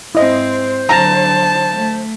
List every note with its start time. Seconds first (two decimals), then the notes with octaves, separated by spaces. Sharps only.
0.15 G#2 C4 E4 C5 D#5
0.89 D3 F#3 A5 A#5
1.72 A3